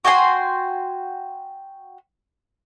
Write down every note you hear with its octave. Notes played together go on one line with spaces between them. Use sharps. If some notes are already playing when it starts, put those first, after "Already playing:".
F#4 G5 G#5 C6